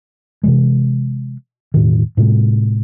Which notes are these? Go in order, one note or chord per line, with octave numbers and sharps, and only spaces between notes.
C3 E3 G#3
E1 A2 D#3
A2 C3 G#3